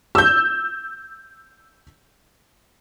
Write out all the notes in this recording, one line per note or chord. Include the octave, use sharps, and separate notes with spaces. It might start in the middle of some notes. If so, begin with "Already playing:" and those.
E6 G6